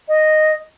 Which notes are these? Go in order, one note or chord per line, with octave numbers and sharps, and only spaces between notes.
D#5